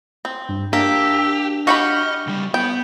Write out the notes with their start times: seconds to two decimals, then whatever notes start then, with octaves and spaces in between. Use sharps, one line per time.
0.25 C4
0.49 G2
0.73 A#3 D4 G4 E5
1.67 F#4 G4 D#5 F5 B5 C#6
2.27 C#2 G3
2.54 B3 G5